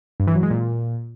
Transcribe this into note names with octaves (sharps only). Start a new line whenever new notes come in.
G2
E3
F#3
G#3
A#2